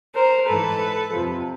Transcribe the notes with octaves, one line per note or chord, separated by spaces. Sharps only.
A#4 C5
G#2 E3 A4 B4
F2 C3 F3